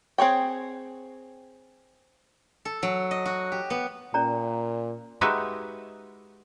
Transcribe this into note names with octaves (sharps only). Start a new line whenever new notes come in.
C4 G#4 C#5 G5
A4
F#3
D#5
F#4
G4
B3
A#2 C#4 D5 A#5
G#3 D#4 F#4 G4 B4 E5